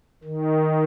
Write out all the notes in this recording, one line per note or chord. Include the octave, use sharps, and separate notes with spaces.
D#3